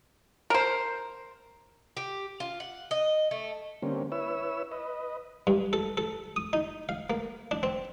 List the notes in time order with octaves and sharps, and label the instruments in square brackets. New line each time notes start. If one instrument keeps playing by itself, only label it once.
[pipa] A#4 C5
[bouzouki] G4
F4
F#5
D#5
A3
[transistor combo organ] D3 G3 A#3 C4 C#4
E4 B4 C#5 E6
B4 D#5
[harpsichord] G2
A4
A4
D#6
D#4
F5
A#3
D4
C4